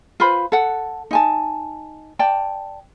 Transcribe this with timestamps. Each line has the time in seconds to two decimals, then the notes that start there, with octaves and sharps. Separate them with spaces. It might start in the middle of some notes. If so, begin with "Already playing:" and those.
0.20 F4 B4 C5 B5
0.52 A4 F#5
1.11 D#4 G#5 A5
2.19 D5 G5 A5